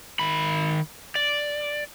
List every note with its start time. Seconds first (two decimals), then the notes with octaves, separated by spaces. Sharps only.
0.20 D#3 B5
1.15 D5